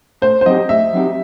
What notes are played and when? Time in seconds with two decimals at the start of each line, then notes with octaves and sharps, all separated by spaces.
0.22 A2 C5
0.41 C5
0.46 F#3 C4 D#4 G4 D#5
0.69 A2 E5
0.93 F#3 C4 D#4 G4